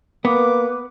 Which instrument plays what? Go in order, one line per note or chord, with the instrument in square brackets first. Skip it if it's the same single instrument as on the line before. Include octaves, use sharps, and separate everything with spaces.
[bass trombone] A#3 [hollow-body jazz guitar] B3 [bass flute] B4 [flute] D6